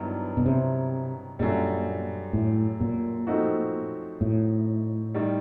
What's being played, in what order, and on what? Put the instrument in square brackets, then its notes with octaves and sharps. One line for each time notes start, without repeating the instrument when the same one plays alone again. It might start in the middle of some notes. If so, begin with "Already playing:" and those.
Already playing: [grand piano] G2 D#3 F#3 B3 E4
[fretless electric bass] B2
C3
[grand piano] F#2 D3 G3 [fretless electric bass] A#2
[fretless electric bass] A2
A#2
[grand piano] F3 A3 C4 D#4 F#4
[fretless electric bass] A2
[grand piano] D#3 G3